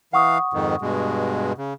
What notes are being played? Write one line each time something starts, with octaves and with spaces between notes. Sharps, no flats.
E3 F5 F#5 C#6 D#6
F2 G#2 D#3
G2 B2 G#3
C#3